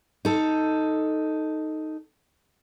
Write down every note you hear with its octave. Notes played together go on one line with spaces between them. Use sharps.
D#4 A4